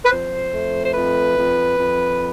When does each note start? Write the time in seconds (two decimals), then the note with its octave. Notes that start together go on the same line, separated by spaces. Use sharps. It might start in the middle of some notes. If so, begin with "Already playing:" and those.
0.04 B4
0.11 F2 C5
0.53 A3
0.85 C5
0.94 F2 B4
1.36 F2
1.77 F2